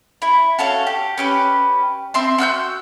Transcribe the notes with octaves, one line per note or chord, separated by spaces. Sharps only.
E4
F#4 A4 C#5 F5
G4
C#4 G4 B4
C4 E5 C6
F#4 E6 F#6 G6